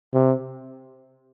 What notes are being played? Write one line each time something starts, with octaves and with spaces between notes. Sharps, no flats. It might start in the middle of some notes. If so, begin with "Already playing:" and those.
C3